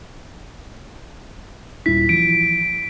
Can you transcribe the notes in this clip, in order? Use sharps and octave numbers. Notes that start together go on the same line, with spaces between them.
D#1 E4 B6
E3 F3 D7